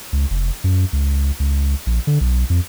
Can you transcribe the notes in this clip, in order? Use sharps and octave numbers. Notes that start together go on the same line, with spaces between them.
C#2
F1
F#2
C#2
C#2
A#1
D3
B1
F2